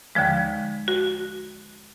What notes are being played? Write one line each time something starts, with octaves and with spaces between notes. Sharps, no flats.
D#2 D3 F3 G#3
F#4